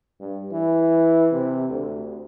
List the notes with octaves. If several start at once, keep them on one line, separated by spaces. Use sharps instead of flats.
G2
E3
C3
D2